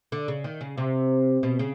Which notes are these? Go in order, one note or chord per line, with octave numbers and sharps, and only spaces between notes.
D3
C#3
D#3
C#3
C3
B2
C#3